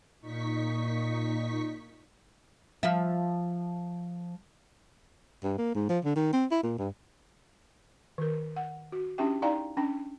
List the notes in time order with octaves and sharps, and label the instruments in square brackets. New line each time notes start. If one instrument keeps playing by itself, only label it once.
[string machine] A#2 D#4 C#6 B6
[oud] F3 E5
[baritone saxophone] G2
A#3
G#2
F3
D3
D#3
C4
E4
A#2
G2
[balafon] D#3 A#4
F#5
F#4
C#4 D4 E4 G4 E5 G5
D#4 E4 D5 F5 G5 A#5
C#4 D4 G5